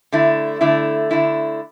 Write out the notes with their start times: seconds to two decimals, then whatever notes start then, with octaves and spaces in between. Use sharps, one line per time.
0.12 D3 A3 E4
0.61 D3 A3 E4
1.11 D3 A3 E4